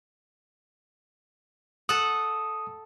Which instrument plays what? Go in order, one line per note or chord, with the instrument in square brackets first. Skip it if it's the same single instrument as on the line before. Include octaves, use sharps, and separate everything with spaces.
[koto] A4 F#5 [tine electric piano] D#6